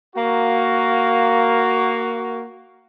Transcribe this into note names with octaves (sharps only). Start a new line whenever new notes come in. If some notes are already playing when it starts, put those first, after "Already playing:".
A#3 F#4